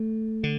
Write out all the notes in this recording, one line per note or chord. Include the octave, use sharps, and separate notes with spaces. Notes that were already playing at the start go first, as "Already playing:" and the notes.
Already playing: A3
D3